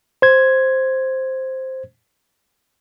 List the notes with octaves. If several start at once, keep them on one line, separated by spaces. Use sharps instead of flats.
C5 G#6